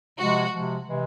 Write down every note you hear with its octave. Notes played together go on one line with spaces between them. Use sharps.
C3 F3 G#3 F#4
C3 F3 G#3
C3 E3 G#3